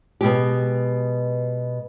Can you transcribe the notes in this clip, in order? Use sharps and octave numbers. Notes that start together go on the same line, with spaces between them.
B2 G#3 G4